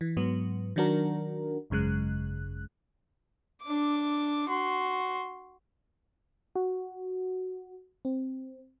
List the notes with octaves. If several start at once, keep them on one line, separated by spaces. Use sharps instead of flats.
E3
G#2 F#3 B3
D#3 F#3 D4 F#4 A#4
G#1 F#2 C#3 G#3 F#6
D4 D6
F#4 C6
F#4
C4